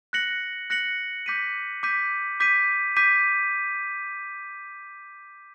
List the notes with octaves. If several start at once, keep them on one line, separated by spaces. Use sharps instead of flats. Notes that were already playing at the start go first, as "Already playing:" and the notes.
F#6 A#6 C#7 F#7
F#6 A#6 C#7 F#7
D6 G6 B6 D#7
D6 G6 B6 D#7
D6 G6 B6 D#7
D6 G6 B6 D#7